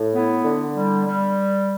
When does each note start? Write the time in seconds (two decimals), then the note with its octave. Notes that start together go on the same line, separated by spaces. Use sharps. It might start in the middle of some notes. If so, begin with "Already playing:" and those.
Already playing: A2
0.14 B3 E4
0.44 D3
0.75 G3
1.05 G3